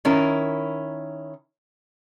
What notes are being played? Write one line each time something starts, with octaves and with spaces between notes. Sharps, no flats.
D#3 C#4 E4 A#4